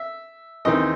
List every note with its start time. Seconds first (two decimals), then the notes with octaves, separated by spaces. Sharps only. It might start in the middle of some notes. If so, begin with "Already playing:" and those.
Already playing: E5
0.65 D#2 C#3 E3 C4 D#4 D#5